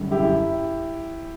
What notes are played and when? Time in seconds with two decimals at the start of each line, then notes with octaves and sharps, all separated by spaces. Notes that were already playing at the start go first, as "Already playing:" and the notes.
Already playing: F#2 D3 G3
0.11 E4 G4